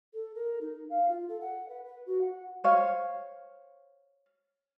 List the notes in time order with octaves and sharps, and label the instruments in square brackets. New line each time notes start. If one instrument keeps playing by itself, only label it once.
[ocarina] A4
A#4
D#4
F5
F4
A4
F#5
B4
B4
F#4
F#5
[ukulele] C5 C#5 F5